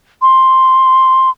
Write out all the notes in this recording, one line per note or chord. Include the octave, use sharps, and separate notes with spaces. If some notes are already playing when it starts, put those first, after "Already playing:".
C6